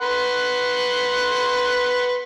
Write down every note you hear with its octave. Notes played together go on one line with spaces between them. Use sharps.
B4 F#5 C6